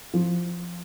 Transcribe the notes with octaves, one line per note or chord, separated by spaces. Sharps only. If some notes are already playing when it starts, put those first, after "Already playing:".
F3